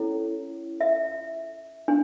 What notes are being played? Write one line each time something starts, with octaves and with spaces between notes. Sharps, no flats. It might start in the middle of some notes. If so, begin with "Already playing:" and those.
Already playing: C#4 E4 A4 C#5
E5
D4